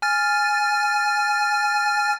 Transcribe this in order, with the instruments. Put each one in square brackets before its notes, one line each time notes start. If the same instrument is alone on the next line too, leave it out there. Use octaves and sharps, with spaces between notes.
[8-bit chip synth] G#5 F6 A6